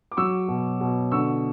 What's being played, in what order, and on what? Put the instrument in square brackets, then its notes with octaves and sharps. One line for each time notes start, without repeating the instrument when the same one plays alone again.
[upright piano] D6
F#3 C#6 E6
B2
B2
D3 C#6 E6